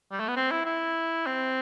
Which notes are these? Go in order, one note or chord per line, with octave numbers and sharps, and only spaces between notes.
G3
A3
B3
C4
E4
E4
C4